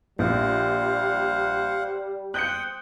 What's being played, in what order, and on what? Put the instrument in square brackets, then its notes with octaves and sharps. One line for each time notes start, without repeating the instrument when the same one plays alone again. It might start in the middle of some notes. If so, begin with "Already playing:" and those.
[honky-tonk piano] A#1 [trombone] G3 [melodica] C5 F5 F#5
[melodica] C5 G5 D#6 [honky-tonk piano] F#6 G6 C#7